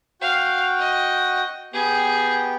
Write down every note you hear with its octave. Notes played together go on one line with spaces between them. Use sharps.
F#4 F5 G5
D#5
B3 G4 G#4 G5